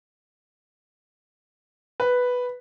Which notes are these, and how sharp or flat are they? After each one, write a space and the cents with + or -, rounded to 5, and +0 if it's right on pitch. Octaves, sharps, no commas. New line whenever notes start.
B4 +0